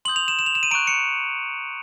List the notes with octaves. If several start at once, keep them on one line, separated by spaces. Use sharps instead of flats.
C6 D#6 G6 F#7
F7
E7
E7
F7
E7
D#7
A#5 C#6 F#6 D7
C#7